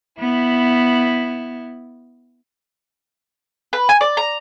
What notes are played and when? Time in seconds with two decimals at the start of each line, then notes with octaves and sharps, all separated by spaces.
0.20 B3 E4
3.73 B4
3.89 G#5
4.01 D5
4.17 A#5